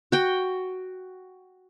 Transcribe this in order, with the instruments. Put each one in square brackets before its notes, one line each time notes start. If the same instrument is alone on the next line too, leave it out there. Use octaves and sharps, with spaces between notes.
[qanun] F#4 G5